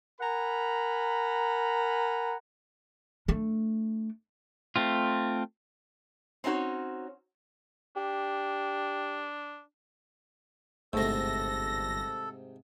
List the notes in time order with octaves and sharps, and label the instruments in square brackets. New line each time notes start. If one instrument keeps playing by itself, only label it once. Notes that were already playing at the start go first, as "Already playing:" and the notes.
[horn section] A#4 F#5 G#5 A#5 B5
[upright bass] A3 D4
[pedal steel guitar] A3 C4 F4
[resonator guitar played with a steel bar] C4 C#4 D#4 F#4 C#5
[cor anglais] D4 [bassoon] G4
[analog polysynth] G1 A#6 [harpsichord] G#2 C3 [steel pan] A3 [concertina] A4